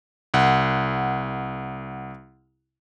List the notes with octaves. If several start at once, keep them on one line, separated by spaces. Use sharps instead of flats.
C2 F#5